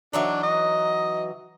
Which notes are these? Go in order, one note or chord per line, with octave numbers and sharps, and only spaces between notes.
E3 F#3 D4 D#4
D#5